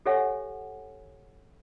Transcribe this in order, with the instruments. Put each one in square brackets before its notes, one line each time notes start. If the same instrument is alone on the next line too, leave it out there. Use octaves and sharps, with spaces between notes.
[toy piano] G4 A4 C#5 E5 F#5 G#5